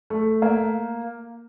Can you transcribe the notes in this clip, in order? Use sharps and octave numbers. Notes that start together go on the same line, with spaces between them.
A3
A#3